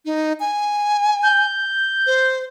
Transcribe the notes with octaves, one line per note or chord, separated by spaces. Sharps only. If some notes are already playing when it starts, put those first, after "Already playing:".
D#4
G#5
G6
C5